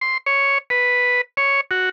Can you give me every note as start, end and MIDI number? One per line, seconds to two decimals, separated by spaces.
0.01 0.18 84
0.26 0.58 73
0.70 1.21 71
1.37 1.61 73
1.71 1.89 66